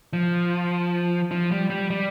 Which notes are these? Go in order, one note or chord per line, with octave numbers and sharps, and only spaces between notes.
F3
F3
G3
G3
G3